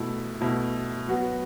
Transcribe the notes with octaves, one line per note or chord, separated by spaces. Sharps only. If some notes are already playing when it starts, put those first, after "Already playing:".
Already playing: B2 A3 E4
B2 A3 E4
F#3 B3 F#4